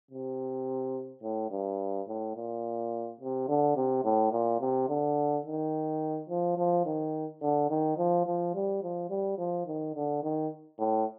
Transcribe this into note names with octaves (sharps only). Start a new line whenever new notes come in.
C3
A2
G2
A2
A#2
C3
D3
C3
A2
A#2
C3
D3
D#3
F3
F3
D#3
D3
D#3
F3
F3
G3
F3
G3
F3
D#3
D3
D#3
A2